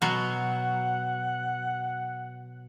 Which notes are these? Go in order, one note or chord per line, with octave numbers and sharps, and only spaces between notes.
B2 F#3 F#5